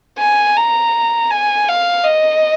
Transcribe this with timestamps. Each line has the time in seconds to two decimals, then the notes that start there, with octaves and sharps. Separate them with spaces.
0.19 G#5
0.56 A#5
1.31 G#5
1.68 F5
2.05 D#5